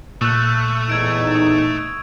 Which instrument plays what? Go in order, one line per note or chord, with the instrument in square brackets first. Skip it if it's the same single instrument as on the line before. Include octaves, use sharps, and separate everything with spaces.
[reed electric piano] A#2 F#6 [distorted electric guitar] A3 [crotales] C#6 E6
[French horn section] E2 A2 D#4 [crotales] G#6 D7
[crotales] D#6